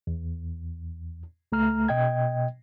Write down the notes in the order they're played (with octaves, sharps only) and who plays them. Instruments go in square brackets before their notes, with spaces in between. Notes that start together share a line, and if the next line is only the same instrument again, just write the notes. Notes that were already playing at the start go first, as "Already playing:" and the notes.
[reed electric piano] E2
C#2 A3 A#5 F6
B2 D#5 G5 G#6